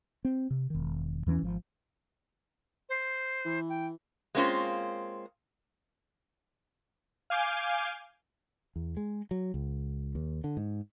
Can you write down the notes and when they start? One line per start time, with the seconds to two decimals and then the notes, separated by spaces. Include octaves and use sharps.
0.25 C4
0.50 C3
0.70 E1 D#3
1.26 E2 E3 B3 C#4
1.42 G#1 F3
2.89 C5
3.45 E3
3.69 G5
4.35 G#3 A#3 C4 C#4 F4 C5
7.30 F5 G#5 D6 G6
8.76 E2
8.97 G#3
9.31 F#3
9.54 C#2
10.15 D#2
10.44 D3
10.57 G#2